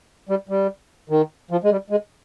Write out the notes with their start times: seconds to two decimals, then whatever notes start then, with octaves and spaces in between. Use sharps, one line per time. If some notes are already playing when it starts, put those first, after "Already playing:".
0.29 G3
0.49 G3
1.10 D#3
1.51 F3
1.64 G#3
1.71 G3
1.90 G#3